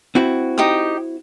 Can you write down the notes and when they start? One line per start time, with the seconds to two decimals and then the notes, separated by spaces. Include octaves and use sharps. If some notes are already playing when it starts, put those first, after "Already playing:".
0.15 C4 E4 F#4
0.58 D#4 G4 D#6